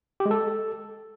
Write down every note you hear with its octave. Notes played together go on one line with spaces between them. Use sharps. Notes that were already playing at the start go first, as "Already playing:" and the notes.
G4
G#3
A4